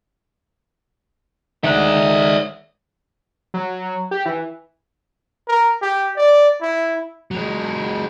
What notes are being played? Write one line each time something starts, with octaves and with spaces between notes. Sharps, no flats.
D#3 G#3 D5 E5 F#5
F#3
G4
E3
A#4
G4
D5
E4
F#3 G#3